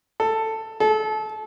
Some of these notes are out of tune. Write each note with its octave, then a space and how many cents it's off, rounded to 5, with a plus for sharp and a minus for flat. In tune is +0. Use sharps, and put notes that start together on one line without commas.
A4 +10
A4 -30